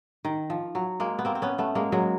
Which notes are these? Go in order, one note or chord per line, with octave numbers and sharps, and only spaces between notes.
D#3
F3
F#3
G#3 A#3
B3
A#3 C4
C4
B3 C#4
A3 B3
G#3 A#3
F#3 G#3